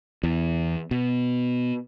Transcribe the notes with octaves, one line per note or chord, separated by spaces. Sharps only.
E2
B2